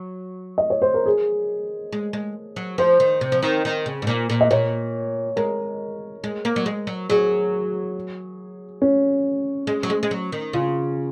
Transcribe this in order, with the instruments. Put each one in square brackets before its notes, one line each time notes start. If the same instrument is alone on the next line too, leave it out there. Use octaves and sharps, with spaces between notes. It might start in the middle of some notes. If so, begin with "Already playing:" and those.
Already playing: [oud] F#3
[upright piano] D#5
C#5
C5
A#4
G#4
[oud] G#3
G#3
F#3
[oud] F3 [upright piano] C5
[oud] D#3
C3
F3
D#3
D#3
C#3
G#2
A#2
A#2
[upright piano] D#5
[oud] A#2 [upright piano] C#5
[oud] G#3 [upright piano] A#4
[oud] G#3
A#3
F#3
G#3
F#3
[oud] F#3 [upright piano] G#4
[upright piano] C#4
[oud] G#3
F#3
G#3
G#3
F#3
D#3
[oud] C#3 [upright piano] F4